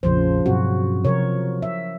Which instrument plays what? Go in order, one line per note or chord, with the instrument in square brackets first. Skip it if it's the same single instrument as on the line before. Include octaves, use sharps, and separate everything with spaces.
[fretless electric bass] A#1 F2 [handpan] C#3 F3 C5
[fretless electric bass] G2 B2 C4 [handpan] F#3 F#4
[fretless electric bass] C3 [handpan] F3 A#4 C#5
[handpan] E5